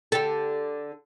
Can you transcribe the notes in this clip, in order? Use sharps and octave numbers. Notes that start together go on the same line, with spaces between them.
D3 G4 A4